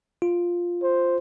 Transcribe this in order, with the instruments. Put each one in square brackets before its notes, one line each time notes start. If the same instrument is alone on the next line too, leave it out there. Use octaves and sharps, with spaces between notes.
[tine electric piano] F4
[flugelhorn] C5